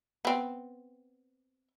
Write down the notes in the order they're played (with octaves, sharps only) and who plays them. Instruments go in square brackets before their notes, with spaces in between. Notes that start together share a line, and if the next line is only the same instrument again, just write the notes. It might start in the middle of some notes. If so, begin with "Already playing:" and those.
[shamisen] B3 C4